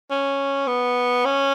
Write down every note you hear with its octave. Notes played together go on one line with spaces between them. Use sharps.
C#4
B3
C#4